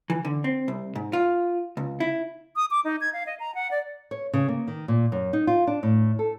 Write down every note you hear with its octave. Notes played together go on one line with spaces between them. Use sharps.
E3
D3
C4
C2
G#2
F4
C#2
E4
D#6
D6
D#4
G#6
F5
D#5
A#5
F#5
D5
C#5
C#3
A#3
D#3
A#2
F#2
D#4
F4
D4
A2
A4